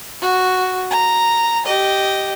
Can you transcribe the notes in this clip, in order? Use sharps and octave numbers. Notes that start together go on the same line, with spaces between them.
F#4
A#5
G4 D#5